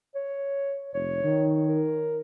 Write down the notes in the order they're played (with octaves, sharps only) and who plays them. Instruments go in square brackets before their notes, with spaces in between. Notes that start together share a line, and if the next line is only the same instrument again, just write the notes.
[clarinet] C#5
[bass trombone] F1 [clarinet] C#5
[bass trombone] D#3
[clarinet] A#4